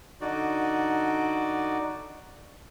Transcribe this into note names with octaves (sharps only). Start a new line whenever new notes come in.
D3 D#4 F#4 D5